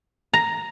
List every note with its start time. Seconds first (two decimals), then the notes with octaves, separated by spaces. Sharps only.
0.33 A#5